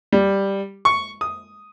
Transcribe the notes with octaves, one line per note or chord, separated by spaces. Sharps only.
G3
C#6
D#6